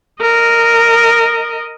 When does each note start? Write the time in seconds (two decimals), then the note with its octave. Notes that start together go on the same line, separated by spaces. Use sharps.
0.21 A#4 D#5